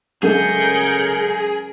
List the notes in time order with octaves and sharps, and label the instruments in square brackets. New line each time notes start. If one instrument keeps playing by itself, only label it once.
[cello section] C#3 A#4 [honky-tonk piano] F#3 G#3 A3 [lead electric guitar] G#4 [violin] G6 C#7